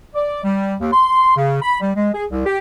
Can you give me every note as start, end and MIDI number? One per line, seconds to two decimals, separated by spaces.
0.15 0.44 74
0.44 0.75 55
0.81 0.91 39
0.93 1.36 84
1.36 1.58 49
1.62 1.78 83
1.81 1.91 55
1.96 2.10 56
2.14 2.25 68
2.31 2.45 36
2.46 2.58 67